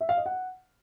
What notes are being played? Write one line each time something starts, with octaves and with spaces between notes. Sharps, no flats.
E5
F5
D#5
F#5